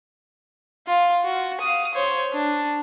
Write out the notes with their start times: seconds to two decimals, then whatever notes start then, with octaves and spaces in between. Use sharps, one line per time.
0.87 F4
1.24 F#4
1.61 F5 D#6
1.94 C5 C#5
2.33 D4